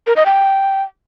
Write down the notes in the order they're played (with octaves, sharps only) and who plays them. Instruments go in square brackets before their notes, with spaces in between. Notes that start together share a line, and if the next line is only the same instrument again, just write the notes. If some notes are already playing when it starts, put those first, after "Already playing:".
[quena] A#4
D#5
G5